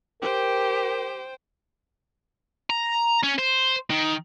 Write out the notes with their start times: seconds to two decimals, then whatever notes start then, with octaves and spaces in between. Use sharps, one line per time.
0.22 G4 A#4 C5 G5
2.70 A#5
3.23 C#4
3.38 C5
3.90 D#3